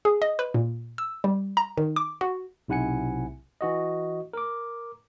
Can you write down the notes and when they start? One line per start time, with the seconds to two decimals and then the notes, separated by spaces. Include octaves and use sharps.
0.05 G#4
0.22 D#5
0.39 B4
0.54 A#2
0.98 E6
1.24 G3
1.57 A#5
1.78 D#3
1.96 D6
2.21 F#4
2.68 B1 C3 E4 F#5 G#5 C#7
3.61 E3 F#4 D#5
4.33 A#4 D6